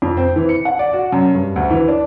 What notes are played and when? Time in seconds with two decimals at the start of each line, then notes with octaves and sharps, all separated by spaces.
0.02 F2
0.17 C4
0.36 E3
0.49 C#7
0.65 F#5
0.79 D5
0.93 F#4
1.12 F#2
1.35 G2
1.56 D2
1.70 E3
1.88 D4